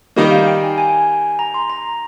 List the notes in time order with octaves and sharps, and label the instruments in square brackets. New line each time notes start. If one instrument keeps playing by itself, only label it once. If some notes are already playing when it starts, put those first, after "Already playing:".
[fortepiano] D#3 G3 A#3 [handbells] D#5
[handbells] F5
G5
G#5
G#5
A#5
C6
A#5